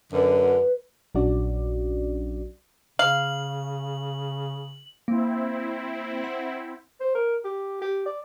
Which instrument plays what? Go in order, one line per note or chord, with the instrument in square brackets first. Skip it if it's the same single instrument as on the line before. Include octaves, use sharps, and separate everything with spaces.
[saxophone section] F#2 D3 [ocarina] B4
[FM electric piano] A#1 F#3 C#4 D4 F#4 D5
[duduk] C#3 [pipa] F5 [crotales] F#7
[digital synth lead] A#3 [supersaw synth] C4 E4
[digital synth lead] F#5
[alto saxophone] C5
A#4
G4
G4
D5